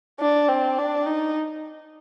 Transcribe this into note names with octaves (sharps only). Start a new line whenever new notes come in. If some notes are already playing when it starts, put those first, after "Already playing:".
D4
C4
D4
D#4